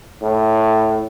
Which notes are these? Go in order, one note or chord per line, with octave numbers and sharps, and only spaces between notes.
A2